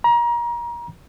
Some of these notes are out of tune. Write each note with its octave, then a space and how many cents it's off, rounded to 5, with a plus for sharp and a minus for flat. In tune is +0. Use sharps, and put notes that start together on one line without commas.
A#5 +30